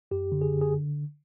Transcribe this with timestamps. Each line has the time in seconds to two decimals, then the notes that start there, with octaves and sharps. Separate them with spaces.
0.11 F#2 G4
0.32 D3
0.42 G#4
0.53 D3
0.61 G#4